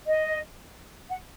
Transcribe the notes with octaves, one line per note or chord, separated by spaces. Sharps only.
D#5
F#5